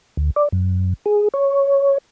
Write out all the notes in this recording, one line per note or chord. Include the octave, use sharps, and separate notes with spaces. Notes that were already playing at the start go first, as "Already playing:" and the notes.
D2
D5
F#2
G#4
C#5